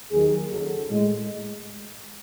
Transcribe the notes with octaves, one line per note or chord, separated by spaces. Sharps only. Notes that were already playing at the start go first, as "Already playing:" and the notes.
D#2 D#3 F#3 G#4
F#2 C#3 F#3 A4
A2 G#3